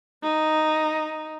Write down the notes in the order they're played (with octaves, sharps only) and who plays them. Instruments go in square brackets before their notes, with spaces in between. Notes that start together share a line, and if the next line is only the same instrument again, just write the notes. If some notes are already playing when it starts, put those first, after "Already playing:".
[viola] D#4